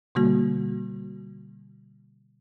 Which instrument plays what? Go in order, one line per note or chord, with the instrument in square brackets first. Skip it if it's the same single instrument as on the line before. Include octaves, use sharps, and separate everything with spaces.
[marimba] B2 D3 G3 A#3 F#4